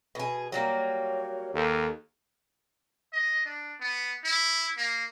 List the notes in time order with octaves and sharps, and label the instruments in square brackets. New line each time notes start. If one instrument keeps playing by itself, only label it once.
[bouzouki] B2 G#4
[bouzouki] F#3 G3 A#3 [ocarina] C#5
[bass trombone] D#2 [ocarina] A4
[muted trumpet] D#5
D4
B3
E4
A#3